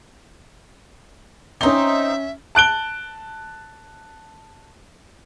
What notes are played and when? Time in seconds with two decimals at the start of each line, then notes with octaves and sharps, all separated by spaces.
1.61 C4 C#4 D#4 E5 G7
2.55 A5 F#6 D7 G7